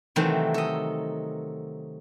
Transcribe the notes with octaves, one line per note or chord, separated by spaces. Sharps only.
C3 D#3 E3 F#3 A3 C4
A4 D#5